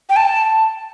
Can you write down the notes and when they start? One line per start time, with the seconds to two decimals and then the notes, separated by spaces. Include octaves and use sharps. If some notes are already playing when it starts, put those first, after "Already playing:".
0.10 G5
0.16 A5